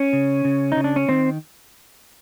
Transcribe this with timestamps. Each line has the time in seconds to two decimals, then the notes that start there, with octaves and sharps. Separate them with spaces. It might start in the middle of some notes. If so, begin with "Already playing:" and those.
Already playing: C#4
0.13 C#3
0.45 C#3
0.72 C#3 D#4
0.84 D4
0.96 C#4
1.09 D#3 C4